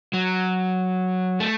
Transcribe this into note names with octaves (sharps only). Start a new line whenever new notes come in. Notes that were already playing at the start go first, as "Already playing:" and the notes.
F#3
A3